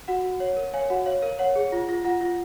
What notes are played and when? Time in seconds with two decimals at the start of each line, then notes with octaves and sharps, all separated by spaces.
0.08 F#4 F#5
0.24 F#4
0.40 C#5
0.57 A#4
0.74 C#5 F5 G#5
0.90 F#4 F#5
1.06 C#5 F5
1.22 A#4 F5
1.39 C#5 F#5
1.56 G#4
1.72 F4
1.89 F4
2.05 F4 F#5
2.21 F4